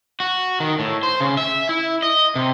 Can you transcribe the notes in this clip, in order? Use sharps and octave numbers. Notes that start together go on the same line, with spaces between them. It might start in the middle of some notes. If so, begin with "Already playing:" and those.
F#4
D#3
A2
C5
C#3
E5
E4
D#5
C3